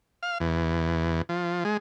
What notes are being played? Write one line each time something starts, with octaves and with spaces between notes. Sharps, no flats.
F5
E2
F3
G#3